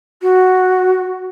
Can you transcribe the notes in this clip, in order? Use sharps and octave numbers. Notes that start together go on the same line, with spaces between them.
F#4